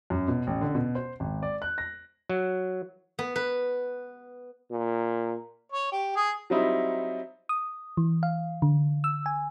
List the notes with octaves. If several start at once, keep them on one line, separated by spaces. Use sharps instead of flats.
F#2
B2
A1
D3
B2
C5
G#1
D5
F#6
A#6
F#3
B3
B4
A#2
C#5
G4
G#4
F#3 G3 C4 D#4 E4
D#6
E3
F5
D3
E6
G#5